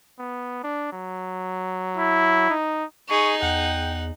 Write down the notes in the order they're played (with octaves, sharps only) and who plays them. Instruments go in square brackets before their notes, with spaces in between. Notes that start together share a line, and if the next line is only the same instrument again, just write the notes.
[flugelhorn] B3
D4
F#3
[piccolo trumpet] E4
[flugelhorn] D#4
[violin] D#4 [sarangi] G#4 [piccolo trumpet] C#6
[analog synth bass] E2 [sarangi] F#5 [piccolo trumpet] G5